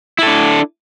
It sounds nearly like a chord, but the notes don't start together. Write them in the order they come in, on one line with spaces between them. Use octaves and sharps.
E4 A4 D4